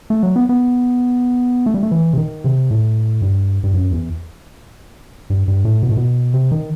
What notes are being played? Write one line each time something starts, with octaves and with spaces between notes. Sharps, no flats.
A3
F#3
B3
B3
A3
G3
A3
E3
C3
D#3
C3
A2
G2
G2
F#2
E2
G2
G2
A2
B2
A2
B2
C3
D#3